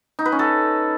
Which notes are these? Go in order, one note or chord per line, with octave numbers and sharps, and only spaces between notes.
D#4
B4
C#4
A4